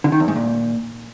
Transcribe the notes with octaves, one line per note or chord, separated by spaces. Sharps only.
D3
D#3
E2
G#2
A#2